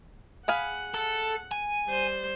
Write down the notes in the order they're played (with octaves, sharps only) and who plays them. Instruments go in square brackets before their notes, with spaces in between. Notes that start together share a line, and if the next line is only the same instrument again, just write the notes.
[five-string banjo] G#4 F5 B5 [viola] F#5
[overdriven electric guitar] A4
G#5
[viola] G3 C5